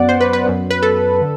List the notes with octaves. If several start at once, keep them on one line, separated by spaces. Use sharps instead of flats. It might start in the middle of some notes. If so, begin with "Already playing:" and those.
Already playing: F#2 F#3 B3 D5 F#5
C5
B4
B4
F#2 F#3 B3
B4
A4
D3